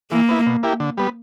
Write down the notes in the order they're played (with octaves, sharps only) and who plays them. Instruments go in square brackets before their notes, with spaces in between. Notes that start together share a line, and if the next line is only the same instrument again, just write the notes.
[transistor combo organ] E3 [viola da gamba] A#3
[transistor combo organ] B3 E4
B2
A#3 E4 G4
D3
G3 B3